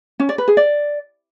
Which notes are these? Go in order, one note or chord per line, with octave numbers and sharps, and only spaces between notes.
C#4
D5
B4
G#4
D5